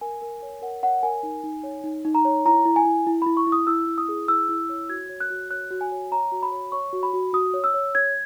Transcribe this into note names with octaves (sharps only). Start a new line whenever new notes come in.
A#4 G#5
A#4
C#5
A#4 F#5
C#5 F#5
A#4 G#5
D#4
D#4
C#5
D#4
D#4
A#5
C#5
E4 A#5
E4
G#5
E4
E4
E4 B5
C#6
E4
D#6
E4 E6
E4
D#6
G#4
E4 E6
E4
C#5
F#4 G#6
C#5
F#6
F#4
C#5 F#6
F#4
G#5
C#5
C#5 A#5
F#4
B5
C#5
C#5 C#6
F#4
B5
F#4
F#4 D#6
C#5
E6
C#5
C#5 G#6